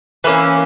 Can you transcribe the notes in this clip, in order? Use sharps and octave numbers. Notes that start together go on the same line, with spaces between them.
E3 A#3 C#4 B4